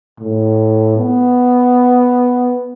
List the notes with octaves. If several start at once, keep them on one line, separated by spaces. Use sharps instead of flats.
A2
B3